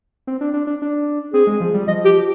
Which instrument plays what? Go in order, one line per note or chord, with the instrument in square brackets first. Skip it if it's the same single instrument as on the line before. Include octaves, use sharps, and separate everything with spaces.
[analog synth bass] C4
D4
D4
D4
D4
[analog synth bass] C4 [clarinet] G#4
[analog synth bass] G#3
F3
G3
[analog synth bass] F3 [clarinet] D#5
[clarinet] G4